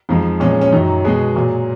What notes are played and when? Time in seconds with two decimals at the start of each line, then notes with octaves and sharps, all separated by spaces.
0.09 F2 F3 G#3 D#4
0.40 A#2 F3 G#3 C#4
0.51 C#4
0.61 C#4
0.72 F#2 D#3 F#3 D#4
1.05 B2 G#3 G#4
1.36 A#2 F#3